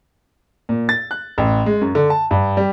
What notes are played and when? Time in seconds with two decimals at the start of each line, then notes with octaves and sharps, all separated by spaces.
0.69 A#2
0.89 A6
1.11 F#6
1.38 A1
1.66 G#3
1.81 F#2
1.95 D3
2.10 A5
2.31 G2
2.57 G3